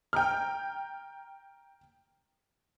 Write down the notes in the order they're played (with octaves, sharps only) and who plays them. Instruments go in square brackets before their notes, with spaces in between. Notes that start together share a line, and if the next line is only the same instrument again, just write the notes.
[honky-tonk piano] G5 A#5 F6